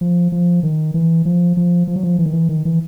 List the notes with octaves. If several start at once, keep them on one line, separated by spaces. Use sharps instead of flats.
F3
F3
D#3
E3
F3
F3
F3
F#3
F3
E3
D#3
E3
D#3
E3